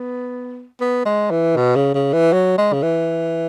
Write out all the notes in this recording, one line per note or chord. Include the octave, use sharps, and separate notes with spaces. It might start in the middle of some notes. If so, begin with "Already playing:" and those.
Already playing: B3
B3
G#3
E3
B2
C#3
C#3
E3
F#3
G#3
C#3
E3